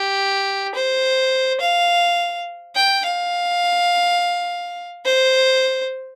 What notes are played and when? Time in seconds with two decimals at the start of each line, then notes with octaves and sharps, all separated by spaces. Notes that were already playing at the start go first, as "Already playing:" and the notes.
Already playing: G4
0.75 C5
1.60 F5
2.75 G5
3.05 F5
5.05 C5